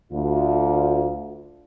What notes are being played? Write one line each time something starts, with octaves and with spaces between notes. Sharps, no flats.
D2 F4